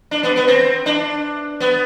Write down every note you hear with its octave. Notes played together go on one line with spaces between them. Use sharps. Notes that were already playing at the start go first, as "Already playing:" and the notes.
D4
B3
B3
C4
D4
B3